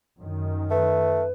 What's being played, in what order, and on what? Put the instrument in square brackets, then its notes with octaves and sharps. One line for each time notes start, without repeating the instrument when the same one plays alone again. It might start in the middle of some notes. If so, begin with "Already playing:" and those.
[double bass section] F#2 D#3
[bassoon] A3 [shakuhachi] B4